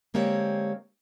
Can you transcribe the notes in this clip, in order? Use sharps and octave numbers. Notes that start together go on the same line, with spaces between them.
D3 G#3 A#3 C4 G4 C#5